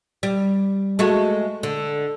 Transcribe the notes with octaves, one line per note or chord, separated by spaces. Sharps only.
G3
G#3 A3 F#4
D3